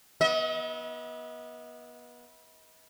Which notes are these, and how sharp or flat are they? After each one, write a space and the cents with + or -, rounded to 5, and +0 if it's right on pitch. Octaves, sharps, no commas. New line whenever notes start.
B3 -25 D#5 +40